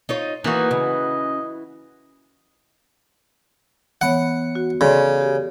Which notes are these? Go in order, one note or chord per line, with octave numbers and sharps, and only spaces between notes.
D#4 F4 C#5
E3 A#3 D#4 F#4
C#3 D#5
E3 B3 C#5 F#5
F#4
C#3 A4 D5 C6
G4